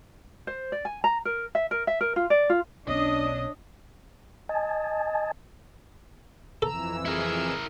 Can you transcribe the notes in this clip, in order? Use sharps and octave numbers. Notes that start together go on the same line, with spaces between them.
C5
D5
G#5
A#5
A#4
E5
A#4
E5
A#4
F4
D5
F4
B1 B2 C#4 D4 C#5 D#5 D#6
D#5 G#5 A5
F2 E3 A4 A#5 E6
E4 G#4 A#4